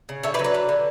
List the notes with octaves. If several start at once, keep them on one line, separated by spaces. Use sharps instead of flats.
C#3
D3 C#5 E5
B4 D5
F#3 C#5
B4 D5
D3
D3